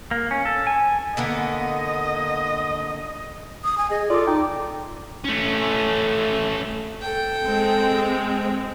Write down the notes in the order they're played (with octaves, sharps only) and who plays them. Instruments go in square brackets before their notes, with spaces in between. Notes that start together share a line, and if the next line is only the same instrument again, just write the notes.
[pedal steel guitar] A#3
C#4
A4
G#5
[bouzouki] D3 A#3 B3 [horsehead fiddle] D#5
[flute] D#6
G#5
[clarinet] G#4 [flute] D#5
[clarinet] F4 [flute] A4 [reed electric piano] D5 D6
[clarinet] D#4 [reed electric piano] G5 D6
[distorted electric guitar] A3 C#4
[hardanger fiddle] A4 G5
[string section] G#3 C4